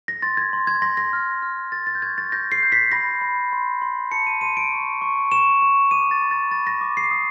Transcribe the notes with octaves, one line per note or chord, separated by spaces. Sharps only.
A#6
C6 A6
G#6
C6
G#6
C6 A#6
A#6
F6
F6
F6 A6
A6
G6
C#6 G#6
A6
G6 A#6
C7
G6
B6
B5 A#6
B5
C6
C6
A5 C#7
D#7
C6 D#7
D7
C#6
C#6
C#6 E7
C#6
D6 D#7
A6
B5
A6
B5 A6
A#6
D6
C7
D#6